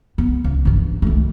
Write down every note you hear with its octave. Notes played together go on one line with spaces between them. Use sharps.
B3
C#2
G2 E3
D#3 A3